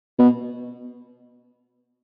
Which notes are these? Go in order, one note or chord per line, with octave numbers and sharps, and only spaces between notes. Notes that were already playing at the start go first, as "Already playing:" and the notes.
B2